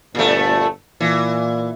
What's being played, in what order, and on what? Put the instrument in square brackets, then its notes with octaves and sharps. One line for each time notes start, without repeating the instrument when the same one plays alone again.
[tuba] G1 [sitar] A#2 A3
[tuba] A#2 [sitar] E3